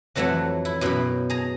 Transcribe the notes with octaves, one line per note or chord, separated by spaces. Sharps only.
F2 E3 F#3 A3 E5 F#5
E4
F#2 B2 E4 C#5 G5 B5
G#4 A#5